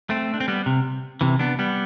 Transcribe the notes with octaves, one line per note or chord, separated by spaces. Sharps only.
A3 C4
D4
C4
G3 B3
C3
C3 E3
B3 D4
G3 B3